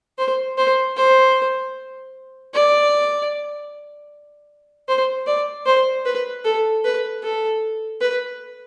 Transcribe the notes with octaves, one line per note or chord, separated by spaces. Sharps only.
C5
C5
C5
D5
C5
D5
C5
B4
A4
B4
A4
B4